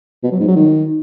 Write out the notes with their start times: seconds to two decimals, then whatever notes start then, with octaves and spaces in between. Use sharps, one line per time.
0.24 B2
0.32 F#3
0.40 G#2
0.48 F#3
0.56 D#3